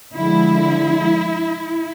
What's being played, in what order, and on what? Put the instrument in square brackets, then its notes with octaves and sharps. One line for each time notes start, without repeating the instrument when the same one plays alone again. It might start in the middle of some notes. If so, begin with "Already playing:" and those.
[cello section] D3 F3 G#3 E4